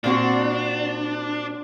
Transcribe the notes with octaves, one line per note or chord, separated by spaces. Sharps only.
A#2 C4 D4 F#4